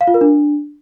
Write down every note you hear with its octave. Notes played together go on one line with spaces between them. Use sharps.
F5
F4
A#4
D4